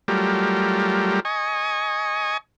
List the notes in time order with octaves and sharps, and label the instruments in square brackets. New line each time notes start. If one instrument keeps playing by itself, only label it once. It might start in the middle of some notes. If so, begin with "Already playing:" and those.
[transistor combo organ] F#3 G3 A3 F4 G4 A#4
D#5 G#5 C#6